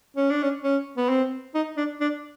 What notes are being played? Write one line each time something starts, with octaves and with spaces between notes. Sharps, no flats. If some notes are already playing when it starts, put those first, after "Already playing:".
C#4
D4
C#4
C#4
B3
C4
D#4
D4
D4